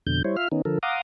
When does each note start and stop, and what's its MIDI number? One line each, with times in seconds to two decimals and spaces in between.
0.07 0.22 41
0.07 0.22 47
0.07 0.22 50
0.07 0.22 91
0.24 0.36 55
0.24 0.36 64
0.24 0.36 72
0.24 0.36 73
0.37 0.48 65
0.37 0.48 76
0.37 0.48 77
0.37 0.48 89
0.52 0.62 51
0.52 0.62 59
0.52 0.62 61
0.52 0.62 63
0.65 0.78 50
0.65 0.78 53
0.65 0.78 69
0.65 0.78 70
0.83 1.01 77
0.83 1.01 78
0.83 1.01 82
0.83 1.01 84
0.83 1.01 86
0.83 1.01 87